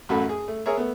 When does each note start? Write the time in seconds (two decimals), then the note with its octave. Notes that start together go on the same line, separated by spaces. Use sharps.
0.09 A1 F#2 F#4 A4 B5
0.29 G#4
0.48 A3
0.66 G#4 A#4 C#5 E5
0.77 A3 B3